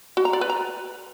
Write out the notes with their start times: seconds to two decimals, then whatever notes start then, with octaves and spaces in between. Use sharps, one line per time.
0.17 F#4
0.25 A#5
0.33 D5
0.41 B4
0.50 A#5